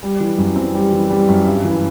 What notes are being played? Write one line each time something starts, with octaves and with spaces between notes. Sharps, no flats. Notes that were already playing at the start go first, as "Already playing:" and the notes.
G3
E3
F#2
C4
G3
E3
G3
F#2
G2
E3